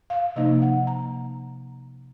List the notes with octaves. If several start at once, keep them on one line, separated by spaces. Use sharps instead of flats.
F5
C3 F3 A#3 D#4 D#5
F#5
A#5